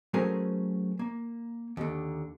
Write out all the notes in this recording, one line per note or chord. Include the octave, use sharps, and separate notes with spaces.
F#3 A3 C#4 G#4 A#4 C5
A#3
D#2 D3